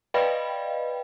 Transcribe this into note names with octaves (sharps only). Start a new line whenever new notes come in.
B4 D5 D#5 F5 G5 B5